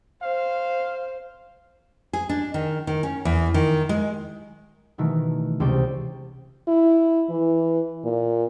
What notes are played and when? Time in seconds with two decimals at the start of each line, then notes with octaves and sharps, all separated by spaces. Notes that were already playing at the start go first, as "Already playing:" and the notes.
0.22 C5 F5
2.13 G#4
2.29 D4
2.54 D#3
2.87 D#3
3.03 C#4
3.25 E2
3.54 D#3
3.89 G#3
4.98 B2 D#3 E3 A3
5.60 C#2 C3 C5 D5 G5
6.68 E4
7.29 E3
8.05 A#2